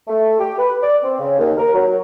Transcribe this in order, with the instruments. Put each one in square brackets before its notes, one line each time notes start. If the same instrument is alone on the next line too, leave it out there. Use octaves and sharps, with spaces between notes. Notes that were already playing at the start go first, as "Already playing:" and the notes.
[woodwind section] A3
G4
B4
D5
C4
C#3
D#2
A#4
F#3